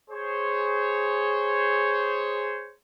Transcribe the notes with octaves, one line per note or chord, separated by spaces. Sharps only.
G#4 C5 C#5